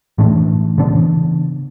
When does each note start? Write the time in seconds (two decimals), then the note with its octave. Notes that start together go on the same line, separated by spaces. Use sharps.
0.18 A2 E3 A3 D4
0.78 C#3 E3 B3 D4